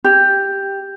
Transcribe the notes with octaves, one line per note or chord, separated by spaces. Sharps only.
G4